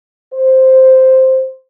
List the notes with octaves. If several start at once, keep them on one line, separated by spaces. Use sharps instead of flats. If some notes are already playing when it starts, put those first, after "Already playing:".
C5